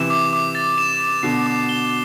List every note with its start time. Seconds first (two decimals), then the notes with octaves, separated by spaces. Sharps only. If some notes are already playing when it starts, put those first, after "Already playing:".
Already playing: C3 E3 E7
0.10 D6
0.33 D6
0.55 A6
0.78 E7
1.00 D6
1.23 B2 D3 C7
1.47 D6
1.69 G7